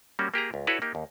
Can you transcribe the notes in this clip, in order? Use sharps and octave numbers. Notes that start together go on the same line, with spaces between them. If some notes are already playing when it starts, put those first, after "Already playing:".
G3 A#3 C#4 F#4
A#3 G4 G#4 A#5
C#2
E4 F#4 A4 B4 C#5 D5
A#3 D#4 G4
D#2